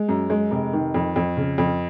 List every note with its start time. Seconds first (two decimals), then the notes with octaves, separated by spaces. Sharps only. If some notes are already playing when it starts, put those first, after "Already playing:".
Already playing: G#3
0.09 F#2
0.30 G#3
0.51 F1
0.73 D#3
0.94 F2
1.16 F2
1.37 C#3
1.58 F2